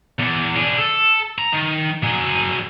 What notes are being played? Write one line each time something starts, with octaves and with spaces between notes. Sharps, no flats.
E2
D4 G#4
A4
A#5
D#3
F#3 G#4